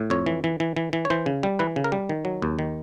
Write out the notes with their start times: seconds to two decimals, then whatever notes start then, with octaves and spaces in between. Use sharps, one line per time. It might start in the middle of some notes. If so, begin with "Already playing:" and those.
Already playing: A2
0.10 F2 C#5
0.26 E3
0.44 E3
0.60 E3
0.76 E3
0.93 E3
1.05 C#5
1.10 E3 C5
1.26 C#3
1.43 G3
1.59 E3 B4
1.76 C#3
1.84 A#4
1.92 G3
2.09 D#3
2.25 F#3
2.42 D#2
2.59 D#3